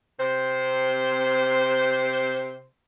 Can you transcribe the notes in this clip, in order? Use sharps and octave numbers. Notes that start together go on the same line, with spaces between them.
C3 C5